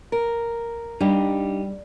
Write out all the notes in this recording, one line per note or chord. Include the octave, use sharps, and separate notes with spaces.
A#4
G3 D4 D#4 G4